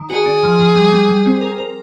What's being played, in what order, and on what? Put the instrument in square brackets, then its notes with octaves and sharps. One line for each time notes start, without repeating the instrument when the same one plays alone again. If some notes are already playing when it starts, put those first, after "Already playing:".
Already playing: [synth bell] D#3
[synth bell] F#4 [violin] G#4
[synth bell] D4
F3
F3
G3
G3
G3
C4
A#4
A#4